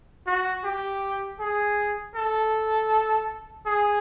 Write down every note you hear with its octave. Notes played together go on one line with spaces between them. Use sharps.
F#4
G4
G#4
A4
G#4